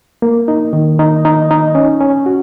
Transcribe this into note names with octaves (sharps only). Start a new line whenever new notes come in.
A#3
D#4
D#3
D#4
D#4
D#4
C#4
C#4
F#4